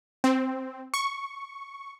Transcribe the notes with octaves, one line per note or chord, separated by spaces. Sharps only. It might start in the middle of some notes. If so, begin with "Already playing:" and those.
C4
C#6